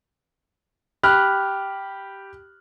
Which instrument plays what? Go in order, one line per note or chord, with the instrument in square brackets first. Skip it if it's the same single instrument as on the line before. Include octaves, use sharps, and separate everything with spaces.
[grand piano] G4 B5 F6 F#6